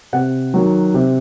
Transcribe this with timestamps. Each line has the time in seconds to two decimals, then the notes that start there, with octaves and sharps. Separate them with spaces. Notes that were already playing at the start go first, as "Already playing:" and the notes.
0.13 C3 F#5
0.54 D#3 F#3
0.94 C3